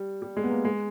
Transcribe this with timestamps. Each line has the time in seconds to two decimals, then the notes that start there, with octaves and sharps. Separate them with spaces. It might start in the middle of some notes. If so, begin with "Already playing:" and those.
Already playing: G3
0.22 G3
0.37 G#3
0.44 B3
0.50 A#3
0.65 G#3